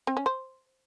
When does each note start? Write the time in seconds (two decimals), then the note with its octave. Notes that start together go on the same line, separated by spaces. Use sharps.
0.07 C4
0.17 C#4
0.26 C5